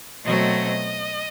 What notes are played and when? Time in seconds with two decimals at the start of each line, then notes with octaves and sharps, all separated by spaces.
0.23 B2 F#3 A3 C4 D#5